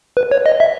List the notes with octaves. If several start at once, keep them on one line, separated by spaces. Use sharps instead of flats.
B4
C#5
D#5
E5